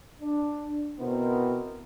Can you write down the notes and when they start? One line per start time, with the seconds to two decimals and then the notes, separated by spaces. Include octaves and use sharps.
0.22 D4
0.99 B2 B3 C4 E4 A#4 C5